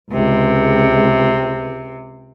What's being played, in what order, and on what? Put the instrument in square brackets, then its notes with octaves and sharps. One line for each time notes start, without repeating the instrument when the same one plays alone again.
[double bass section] C#2 [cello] C3